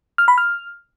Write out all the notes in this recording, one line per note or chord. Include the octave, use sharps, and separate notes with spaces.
F6
B5
F6